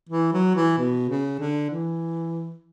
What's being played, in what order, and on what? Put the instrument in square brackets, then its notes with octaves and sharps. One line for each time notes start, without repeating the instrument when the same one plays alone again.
[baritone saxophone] E3
F#3
E3
B2
C#3
D3
E3